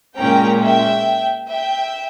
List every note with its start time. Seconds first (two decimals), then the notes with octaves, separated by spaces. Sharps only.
0.19 A#2 G#3 C#4 G5 A#5
0.62 E5 G5
1.50 E5 G5